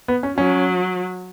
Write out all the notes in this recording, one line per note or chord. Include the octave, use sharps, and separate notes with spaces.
B3
C#4
F#3 C#4